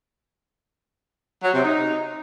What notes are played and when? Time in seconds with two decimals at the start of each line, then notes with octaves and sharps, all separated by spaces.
1.44 F#3
1.54 C3
1.64 D#4